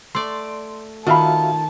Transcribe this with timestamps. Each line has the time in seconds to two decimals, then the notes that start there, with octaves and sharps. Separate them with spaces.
0.15 A3 D5 C6
1.07 D#3 F4 F#4 E5 F5 A5 B5